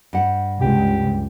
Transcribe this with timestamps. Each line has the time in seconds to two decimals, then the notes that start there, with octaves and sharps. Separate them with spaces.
0.13 G2 F#5
0.61 C#2 G4